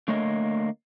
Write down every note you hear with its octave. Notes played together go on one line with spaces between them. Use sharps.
D3 A3 A#3 C#5 D#5